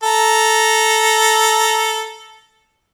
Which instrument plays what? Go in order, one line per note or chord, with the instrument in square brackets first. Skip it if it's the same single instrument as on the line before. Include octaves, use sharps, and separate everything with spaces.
[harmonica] A4 A#5